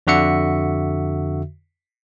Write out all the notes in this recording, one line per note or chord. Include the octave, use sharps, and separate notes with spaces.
F2 D3 F#4 E5 C#7